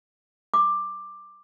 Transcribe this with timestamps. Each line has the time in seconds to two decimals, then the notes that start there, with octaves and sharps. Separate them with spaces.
0.54 D6